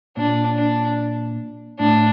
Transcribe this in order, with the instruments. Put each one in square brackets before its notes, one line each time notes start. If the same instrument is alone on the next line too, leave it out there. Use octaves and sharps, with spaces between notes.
[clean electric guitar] A#2 [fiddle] D4
[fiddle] D4
[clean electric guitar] A2 [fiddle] D4